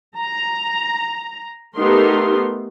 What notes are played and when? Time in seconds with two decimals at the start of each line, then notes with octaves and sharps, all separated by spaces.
0.17 A#5
1.76 A3 B3 D#4 G4 A#4 C6